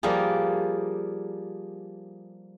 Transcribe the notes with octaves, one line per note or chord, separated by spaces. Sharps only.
F3 G3 A#3 F4 G#4